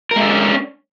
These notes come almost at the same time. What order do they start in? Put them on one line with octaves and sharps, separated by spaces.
A#4 G#3 A4 D4 C#4